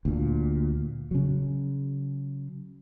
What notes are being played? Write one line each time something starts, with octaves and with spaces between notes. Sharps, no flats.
D2 A#2
C#3 F#3